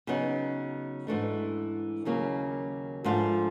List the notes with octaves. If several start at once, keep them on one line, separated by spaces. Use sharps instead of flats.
C#3 F#3 B3 D#4
G#2 E3 A3 D4
D#2 C#3 F#3 A#3
G#2 F3 A3 D4 F4